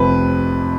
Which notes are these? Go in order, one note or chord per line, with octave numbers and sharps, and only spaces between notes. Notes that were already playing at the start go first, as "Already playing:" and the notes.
Already playing: F1 F2 C3 B4